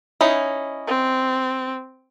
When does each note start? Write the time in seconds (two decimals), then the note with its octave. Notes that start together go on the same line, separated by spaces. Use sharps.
0.21 C#4 D#4 E4
0.88 C4